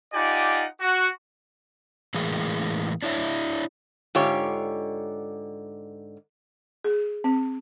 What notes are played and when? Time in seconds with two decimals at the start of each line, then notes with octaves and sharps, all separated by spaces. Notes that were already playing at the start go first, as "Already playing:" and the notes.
0.14 D#4 F4 G4 D5 F#5 G#5
0.80 F#4
2.14 A2 E3 G#3 A#3 G#4
3.02 D4 E4 C#5 E5
4.15 G#2 D3 F4 G4 C#5
6.84 G#4
7.24 C4